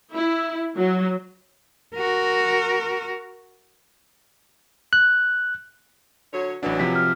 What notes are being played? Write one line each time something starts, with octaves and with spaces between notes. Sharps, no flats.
E4
F#3
F#4 A#4
F#6
D3 F#3 C#5
A1 E3 F#3 D4
C3 F3 B6
F6